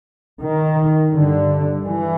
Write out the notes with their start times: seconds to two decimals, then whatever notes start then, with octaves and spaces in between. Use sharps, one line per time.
0.41 D#3
1.13 G2 D3
1.85 E3